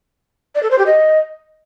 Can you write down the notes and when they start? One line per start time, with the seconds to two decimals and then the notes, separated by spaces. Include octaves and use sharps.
0.55 D5
0.63 A4
0.71 C5
0.79 G4
0.86 D#5